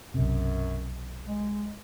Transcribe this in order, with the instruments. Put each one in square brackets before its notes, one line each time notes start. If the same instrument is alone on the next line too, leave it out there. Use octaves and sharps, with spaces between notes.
[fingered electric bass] B1 C3 [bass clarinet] F#2
[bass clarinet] G#3